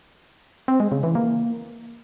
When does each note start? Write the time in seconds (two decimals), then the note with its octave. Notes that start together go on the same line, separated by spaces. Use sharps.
0.68 C4
0.80 G#3
0.92 C#3
1.03 E3
1.15 A#3